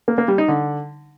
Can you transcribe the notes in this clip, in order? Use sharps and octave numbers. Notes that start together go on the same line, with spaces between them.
A#3
A#3
G3
D#4
D3